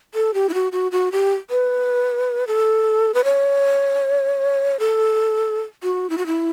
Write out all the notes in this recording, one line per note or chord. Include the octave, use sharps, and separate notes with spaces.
A4
G4
E4
F#4
F#4
F#4
G4
B4
A4
B4
C#5
A4
F#4
E4
F#4
E4